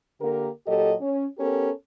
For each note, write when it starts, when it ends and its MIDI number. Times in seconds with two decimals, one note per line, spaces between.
0.21 0.49 50
0.21 0.49 58
0.21 0.49 67
0.21 0.49 70
0.67 0.93 46
0.67 0.93 54
0.67 0.93 67
0.67 0.93 69
0.67 0.93 75
1.01 1.25 61
1.38 1.69 59
1.38 1.69 61
1.38 1.69 67
1.38 1.69 69
1.38 1.69 70